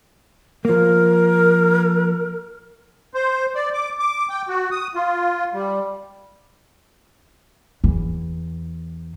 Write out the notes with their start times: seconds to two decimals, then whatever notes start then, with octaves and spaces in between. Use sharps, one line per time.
0.65 F3 A#3 A#4
3.14 C5
3.55 D5
3.74 D6
3.99 D6
4.30 G5
4.48 F#4
4.72 D#6
4.95 F4
5.54 G3
7.84 E2